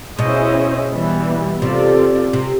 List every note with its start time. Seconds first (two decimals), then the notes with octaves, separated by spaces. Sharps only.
0.18 B2 C#4 E4 G#4 C5 D#5
0.90 E3 G3 B3
1.62 C3 C4 F4 A4 D5
2.33 C3